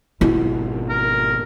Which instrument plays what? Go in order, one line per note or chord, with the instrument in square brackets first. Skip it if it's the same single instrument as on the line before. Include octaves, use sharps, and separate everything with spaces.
[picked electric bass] G#1 B2 [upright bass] E4 F4
[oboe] A#4